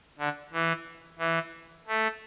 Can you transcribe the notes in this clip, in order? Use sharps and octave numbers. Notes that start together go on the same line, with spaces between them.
D3
E3
E3
A3